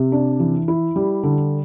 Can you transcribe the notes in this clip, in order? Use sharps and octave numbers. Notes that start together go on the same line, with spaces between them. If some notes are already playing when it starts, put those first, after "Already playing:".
Already playing: C3
D4
E3
E4
G3
D3